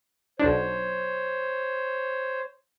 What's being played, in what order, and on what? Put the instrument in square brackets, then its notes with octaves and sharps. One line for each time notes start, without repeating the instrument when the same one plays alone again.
[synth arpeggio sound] B1 D4 [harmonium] C5 C#5